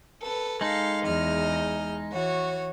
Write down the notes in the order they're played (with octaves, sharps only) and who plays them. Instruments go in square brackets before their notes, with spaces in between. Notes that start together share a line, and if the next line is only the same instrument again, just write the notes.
[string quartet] A4 B4
[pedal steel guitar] G#3 D#4 [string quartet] A4 F5
[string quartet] E2 D#5 F6
E3 F#4 C#5